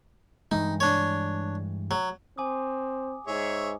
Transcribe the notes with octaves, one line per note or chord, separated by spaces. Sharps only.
G2 E3 G#3 D#4
D4 C#5
F#3
C4 G#5 D6 D#6
G#2 G#4 C#5 E5